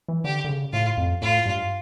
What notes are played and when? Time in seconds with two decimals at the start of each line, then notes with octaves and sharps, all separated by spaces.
0.08 E3
0.24 D3 G4
0.45 D3
0.49 C#3
0.73 A2 F4
0.97 F2
1.22 A2 F4
1.46 G2